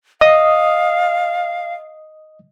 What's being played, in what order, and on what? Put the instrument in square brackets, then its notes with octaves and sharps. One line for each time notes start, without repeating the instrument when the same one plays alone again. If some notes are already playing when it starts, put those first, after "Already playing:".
[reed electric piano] D#5 D#6 [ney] F5